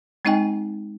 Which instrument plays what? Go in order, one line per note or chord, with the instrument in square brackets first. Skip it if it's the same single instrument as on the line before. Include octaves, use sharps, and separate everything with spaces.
[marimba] G#3 C4 D#4 D#5 G5 G#5